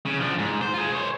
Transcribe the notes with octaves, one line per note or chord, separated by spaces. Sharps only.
C#3
F3 D4
G#2
C5
F4 G#4
C5 C#5